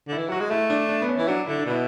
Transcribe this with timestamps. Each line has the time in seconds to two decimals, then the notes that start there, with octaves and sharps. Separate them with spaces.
0.08 D3 E4
0.18 E3
0.29 F#3 F#4
0.40 G#3
0.50 A3 E4
0.70 D4
0.89 D4
1.02 B3
1.09 C#4
1.17 E3 E4
1.28 F#3 D4
1.46 D3 E4
1.59 D4
1.66 B2 E4